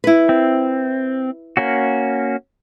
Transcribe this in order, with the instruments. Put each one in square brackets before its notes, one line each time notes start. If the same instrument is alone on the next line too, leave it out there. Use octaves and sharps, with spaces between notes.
[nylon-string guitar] E4 B4
[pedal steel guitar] C4
A#3 C#4 F#4